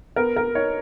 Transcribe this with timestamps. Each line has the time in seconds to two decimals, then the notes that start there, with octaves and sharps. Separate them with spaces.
0.16 B3 A#4
0.36 A#4
0.55 D#4 C#5